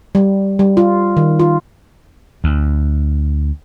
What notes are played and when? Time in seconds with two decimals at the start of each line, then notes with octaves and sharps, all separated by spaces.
0.15 G3
0.59 G3
0.77 F4
1.17 D#3
1.39 F4
2.44 D2